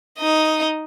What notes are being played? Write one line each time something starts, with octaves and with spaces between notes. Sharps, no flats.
D#4 D#5